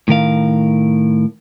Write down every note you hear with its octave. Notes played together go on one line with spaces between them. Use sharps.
A2 D#3 A#4 F5